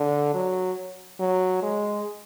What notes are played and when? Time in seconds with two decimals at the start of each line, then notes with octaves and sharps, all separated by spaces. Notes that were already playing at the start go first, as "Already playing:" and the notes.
Already playing: D3
0.34 F#3
1.20 F#3
1.62 G#3